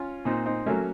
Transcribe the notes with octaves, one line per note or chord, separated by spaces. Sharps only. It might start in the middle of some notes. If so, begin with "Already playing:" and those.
Already playing: C#4 F4
A#2 C4 D#4
C4 D#4
F#3 A3 A#3 C#4